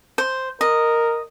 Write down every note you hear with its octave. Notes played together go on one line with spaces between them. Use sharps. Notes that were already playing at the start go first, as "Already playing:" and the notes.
C5
A#4 D#5